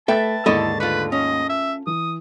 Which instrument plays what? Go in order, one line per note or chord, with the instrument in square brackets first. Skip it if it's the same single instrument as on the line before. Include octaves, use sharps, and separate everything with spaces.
[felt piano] A3 A6 [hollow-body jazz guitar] A4 [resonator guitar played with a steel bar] B4 E5 G5 [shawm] A5
[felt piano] D#2 G#2 C#6 [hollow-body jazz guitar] D3 A4 D#5 [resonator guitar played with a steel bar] E4
[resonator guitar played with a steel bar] A3 F4 [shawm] B4
[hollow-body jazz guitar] C#4 [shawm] D#5
[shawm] E5
[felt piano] E3 [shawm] D#6